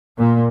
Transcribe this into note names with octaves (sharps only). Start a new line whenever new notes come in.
A#2